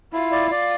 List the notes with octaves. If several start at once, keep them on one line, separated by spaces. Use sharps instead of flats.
E4 F4
D5
D5